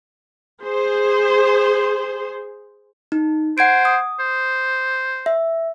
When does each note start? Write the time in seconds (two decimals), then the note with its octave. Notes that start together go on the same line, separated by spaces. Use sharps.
0.61 G#4 C5
3.12 D#4
3.58 C5 F#5 G#6 D7
3.85 D#6
4.19 C5
5.26 E5